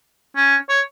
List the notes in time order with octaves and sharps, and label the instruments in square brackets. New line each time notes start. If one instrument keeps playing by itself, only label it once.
[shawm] C#4
C#5